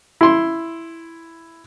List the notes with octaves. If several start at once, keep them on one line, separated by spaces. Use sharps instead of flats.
E4 C6